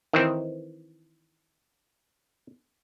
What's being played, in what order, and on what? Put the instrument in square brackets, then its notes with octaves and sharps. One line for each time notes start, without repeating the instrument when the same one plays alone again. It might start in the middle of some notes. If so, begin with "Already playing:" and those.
[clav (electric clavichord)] D#3 E3 C4